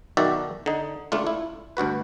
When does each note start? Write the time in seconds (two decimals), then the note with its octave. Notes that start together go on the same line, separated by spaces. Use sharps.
0.17 B1 D#3 F#4 D5 E5 G5
0.66 D3 D#4
1.12 C#2 A3 D4 F4
1.27 E4
1.77 D2 G2 F#4 B4